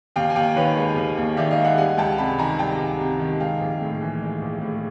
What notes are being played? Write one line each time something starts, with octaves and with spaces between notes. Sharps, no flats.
D#2 F5 G5
G#5
D#2 F5 G5
D#3 B4 C#5
G#3
D#2
D#2
D#3 D5 E5
D#5 F5
G#3
E5 F#5
G3 F#5 G#5
C#2 G5 A5
C3 A5 B5
D#3 G#5 A#5
G3 G5 A5
C#2
C3
D#3
G#3 F5 G5
A#1
A2
E3
G#3
A#1
A2